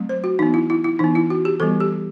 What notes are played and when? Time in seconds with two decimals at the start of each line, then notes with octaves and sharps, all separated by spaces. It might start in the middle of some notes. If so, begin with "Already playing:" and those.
Already playing: F#3 A3 C4
0.09 C5
0.24 F#4
0.39 E3 B3 D#4
0.54 E4
0.70 E4
0.84 E4
0.99 E3 B3 D#4
1.15 E4
1.30 F#4
1.45 G4
1.60 E3 G3 B3 A4
1.80 G4